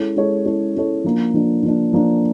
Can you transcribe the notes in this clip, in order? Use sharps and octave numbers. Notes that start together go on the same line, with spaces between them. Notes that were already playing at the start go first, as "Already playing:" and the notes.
Already playing: G#3 C#4 E4 A4 C#5
G#3 C#4 E4 A4 C#5
G#3 C#4 E4 A4 C#5
G#3 C#4 E4 A4 C#5
F3 A#3 D4
F3 A#3 D4
F3 A#3 D4
F3 A#3 D4